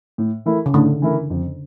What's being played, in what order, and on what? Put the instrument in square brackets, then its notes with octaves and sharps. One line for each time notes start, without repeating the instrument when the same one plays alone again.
[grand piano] A2
E3 A3 E4 A#4
[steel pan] C#3
[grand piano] A2 [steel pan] D3
[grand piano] E3 A3 E4 A#4
F2